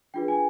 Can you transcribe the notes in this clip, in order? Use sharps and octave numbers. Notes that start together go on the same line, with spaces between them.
D4 F4 G#4 B4 G5
G#5